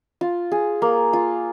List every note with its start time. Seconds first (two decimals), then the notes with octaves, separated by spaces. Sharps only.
0.21 F4
0.52 G#4
0.82 A#3
1.13 F4